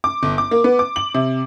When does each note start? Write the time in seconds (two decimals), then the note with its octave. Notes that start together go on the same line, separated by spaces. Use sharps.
0.04 D6
0.23 G1
0.38 D6
0.51 A#3
0.64 B3
0.79 D6
0.96 F#7
1.15 C3